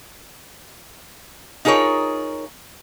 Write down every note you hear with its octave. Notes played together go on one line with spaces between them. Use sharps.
D#4 F4 G#4 A#4 C#5